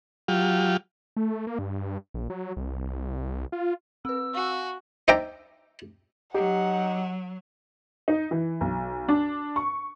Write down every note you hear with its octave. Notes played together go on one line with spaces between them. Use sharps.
F#3 F4 G4
A3
A#3
G2
A#1
F#3
C2
F4
C4 B4 E6
F#4 F5 G#5
D#4 C5 D5 E5 G5 A#5
F#3 D#4 G4 F#5
D#4
E3
B1
D4
C#6